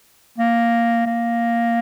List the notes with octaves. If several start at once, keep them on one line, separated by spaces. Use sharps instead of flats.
A#3
A#3